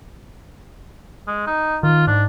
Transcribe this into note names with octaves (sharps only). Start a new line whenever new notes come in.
G#3
D#4
D#3 F4
G#2 D4